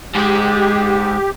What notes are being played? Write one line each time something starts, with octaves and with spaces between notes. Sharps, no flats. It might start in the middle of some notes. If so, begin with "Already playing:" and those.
G#2 G#3 G4